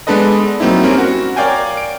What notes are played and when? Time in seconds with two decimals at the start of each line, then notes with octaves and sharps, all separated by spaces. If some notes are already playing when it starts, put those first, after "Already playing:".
0.07 G#3 B3 D4 A4 B4 D#5
0.60 F#3 A#3 C4 D#4 E4
0.83 G3 C4 C#4 A#4
0.98 F#4
1.36 A#4 C#5 D5 F5 G5 G#5
1.77 D7